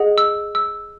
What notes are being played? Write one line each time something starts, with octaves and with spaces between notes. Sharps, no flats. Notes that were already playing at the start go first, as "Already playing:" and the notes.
Already playing: G#4 D#5 F#5
E6
E6